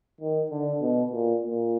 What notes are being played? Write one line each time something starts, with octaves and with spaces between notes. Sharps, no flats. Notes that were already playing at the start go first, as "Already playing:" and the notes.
D#3
D3
B2
A#2
A#2